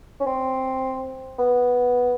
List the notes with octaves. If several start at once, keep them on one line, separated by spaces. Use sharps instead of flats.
C#4
C4
B3